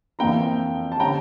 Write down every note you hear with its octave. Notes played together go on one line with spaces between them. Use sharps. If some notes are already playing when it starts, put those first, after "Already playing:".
F2 E3 A#3 D4 G5 A#5
A5
D3 G3 C#4 G5 A#5